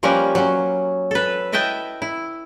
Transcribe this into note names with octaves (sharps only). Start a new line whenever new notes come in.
F3 G3 A#3 C#4 A#4 B4
F#3 C#4
A4 B4
E4 B4 D#5 E5 G5 A5
E4